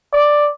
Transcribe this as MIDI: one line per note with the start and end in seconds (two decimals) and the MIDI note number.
0.13 0.47 74